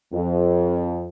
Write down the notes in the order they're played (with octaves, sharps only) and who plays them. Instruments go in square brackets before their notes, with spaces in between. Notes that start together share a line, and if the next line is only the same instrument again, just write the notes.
[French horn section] F2